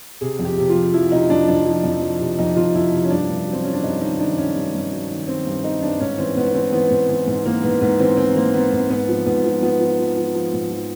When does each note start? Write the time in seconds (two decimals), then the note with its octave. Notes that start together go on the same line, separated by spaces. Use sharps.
0.21 C3 G#4
0.39 F2
0.45 G4
0.58 C3
0.69 F4
0.75 F3
0.94 F3 E4
1.12 C3 D#4
1.30 F2 D4
1.48 F2 D4
1.66 F3
1.84 F2
2.02 F3
2.20 C3
2.39 F2 D#4
2.56 F2 F4
2.75 F2 E4
2.92 C3
3.05 C#4
3.11 G2 D4
3.29 G2
3.47 F#3
3.53 C4
3.63 F#3 C#4
3.73 D4
3.83 G2 D#4
4.01 D#3 D#4
4.19 D#3 D4
4.37 G2 C#4
4.55 G2
4.74 G2
4.92 F#3
5.10 D#3
5.28 D#3 C4
5.46 G2
5.64 D#3 D#4
5.83 G2 D4
6.00 G#2 C#4
6.18 E3 C4
6.37 G#2 B3
6.54 E3 C4
6.73 E3 B3
6.90 G#2
7.09 E3
7.27 G#2
7.45 E3 A#3
7.63 G#2 B3
7.81 G#2 B3
8.00 E3 C4
8.17 E3 C4
8.36 E3 A#3
8.54 E3 B3
8.72 G#2
8.90 G#2 B3
9.09 F3
9.26 G#2 B3
9.45 F3
9.62 F3 B3
9.80 F3
9.99 F3
10.17 F3
10.35 F3
10.53 G#2
10.71 F3